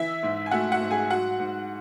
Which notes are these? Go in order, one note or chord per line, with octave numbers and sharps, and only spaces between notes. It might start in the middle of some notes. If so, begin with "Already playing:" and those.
Already playing: E3 E4 E5
G#2
G#5
A3 F#4 F#5
F#4 F#5
G#2
G#4 G#5
F#3 F#4 F#5
G#2